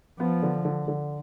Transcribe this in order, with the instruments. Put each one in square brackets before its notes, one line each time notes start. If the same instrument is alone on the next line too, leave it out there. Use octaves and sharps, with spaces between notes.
[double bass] F3 [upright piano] B3
[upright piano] D3
D3
D3